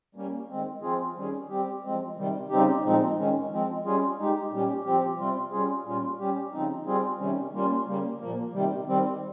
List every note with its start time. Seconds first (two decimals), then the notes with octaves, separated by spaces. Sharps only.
0.15 G3 A#3 C#4
0.48 D#3 G#3 C4
0.82 F3 C4 F4 G#4
1.16 D#3 G3 C#4 G#4
1.49 G3 C4 G4
1.82 F3 G#3 C4
2.17 C3 D#3 G3
2.49 C#3 G3 C4 D#4 G4
2.84 A#2 F3 G#3 C4 D#4
3.18 D#3 G#3 C#4
3.50 F3 G#3 C4
3.85 G3 C#4 F4 G#4
4.18 G#3 D#4 G4
4.51 A#2 G3 C#4 G4
4.85 F3 C4 G4
5.17 C3 G3 C4 F4
5.51 G3 C#4 F4 G#4
5.85 A#2 G3 C#4 F4
6.18 G3 C#4 G4
6.52 C#3 F3 C4 D#4
6.86 G3 C4 F4 G#4
7.19 C3 D#3 G3 C#4
7.53 G3 A#3 C#4 F4
7.86 C#3 G3 A#3
8.20 A#2 F3 A#3
8.53 C3 D#3 G3
8.87 D#3 G3 C4